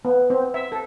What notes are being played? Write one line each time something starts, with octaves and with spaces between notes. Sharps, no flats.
B3
C4
E5
A4